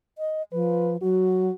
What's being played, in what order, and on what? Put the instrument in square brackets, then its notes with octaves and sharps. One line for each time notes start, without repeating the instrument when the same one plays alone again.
[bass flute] D#5
[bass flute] F3 [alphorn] B4
[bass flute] F#3 [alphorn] F#4